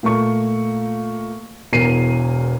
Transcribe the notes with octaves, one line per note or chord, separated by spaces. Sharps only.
A#2 A3 A#3 C#6
E1 E2 A#4 C7 D#7